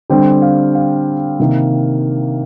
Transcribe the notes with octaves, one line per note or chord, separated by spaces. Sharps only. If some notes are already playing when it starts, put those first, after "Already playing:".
D3 G3 C4 G5
F5
F5
C3 D#3 A#3